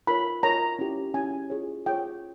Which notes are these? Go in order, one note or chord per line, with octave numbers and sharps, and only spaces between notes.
F4 A#4 C#5 B5
F4 A#4 C#5 A#5
C#4 E4 G4
C#4 E4 G4 G#5
F4 G#4 C#5
F4 G#4 C#5 G5